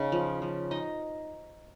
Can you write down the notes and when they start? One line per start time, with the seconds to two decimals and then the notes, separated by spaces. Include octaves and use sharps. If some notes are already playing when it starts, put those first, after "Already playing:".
Already playing: C#3 D#4
0.12 F3
0.42 F3
0.71 D#4 D#5